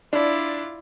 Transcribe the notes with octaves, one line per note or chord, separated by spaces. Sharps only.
D4 E4 F4 D5